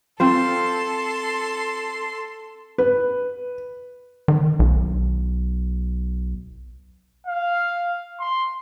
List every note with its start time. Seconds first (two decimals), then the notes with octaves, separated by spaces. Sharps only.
0.20 C4 F4 A4 C5 C6
2.78 B4
4.28 D#3
4.59 B1
7.27 F5
8.20 C6